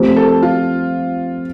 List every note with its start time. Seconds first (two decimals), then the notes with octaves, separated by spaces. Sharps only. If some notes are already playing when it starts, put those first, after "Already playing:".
Already playing: F3 A3 C4 G4 C5
0.17 A4
0.43 F4